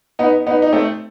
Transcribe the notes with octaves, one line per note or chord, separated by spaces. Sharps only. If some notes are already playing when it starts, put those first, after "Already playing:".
B3 D#4
B3 D#4
D#4
A3 C4